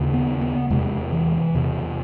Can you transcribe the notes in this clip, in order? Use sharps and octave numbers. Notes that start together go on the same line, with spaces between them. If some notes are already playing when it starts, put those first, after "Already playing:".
Already playing: D#2 C#3
B3
B3
E2 C3 G#3
E3
E2 C3